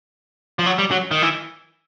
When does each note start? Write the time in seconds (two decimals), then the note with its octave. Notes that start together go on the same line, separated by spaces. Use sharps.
0.59 F3
0.66 F#3
0.79 G3
0.91 F#3
1.11 D#3
1.22 E3